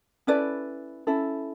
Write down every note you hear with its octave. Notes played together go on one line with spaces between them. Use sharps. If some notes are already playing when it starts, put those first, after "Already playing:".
C#4 E4 A4 B4 D5
C#4 E4 A4